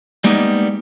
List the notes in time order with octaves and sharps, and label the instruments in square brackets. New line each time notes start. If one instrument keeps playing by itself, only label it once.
[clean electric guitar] G3 G#3 A#3 B3 D#4